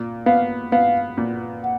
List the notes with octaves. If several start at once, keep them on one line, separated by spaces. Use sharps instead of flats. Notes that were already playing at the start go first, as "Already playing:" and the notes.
Already playing: A#2
B3 F5
B3 F5
A#2
F#5